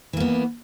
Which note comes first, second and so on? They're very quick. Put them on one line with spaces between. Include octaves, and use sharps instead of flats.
E3 A#3 B3